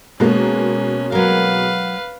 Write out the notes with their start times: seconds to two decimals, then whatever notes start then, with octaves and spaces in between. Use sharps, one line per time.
0.20 B2 G#3 A#3 C#4
1.12 F#3 A#4 B4 F5